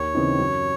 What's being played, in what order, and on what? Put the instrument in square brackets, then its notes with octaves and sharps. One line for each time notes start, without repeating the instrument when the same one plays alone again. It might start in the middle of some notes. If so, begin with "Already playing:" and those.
Already playing: [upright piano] D#2 [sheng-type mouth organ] C#5
[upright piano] C#3 E3 C4 D#4
F#2